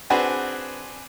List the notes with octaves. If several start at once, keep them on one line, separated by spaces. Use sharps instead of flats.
C4 D4 F#4 G#4 B4 C5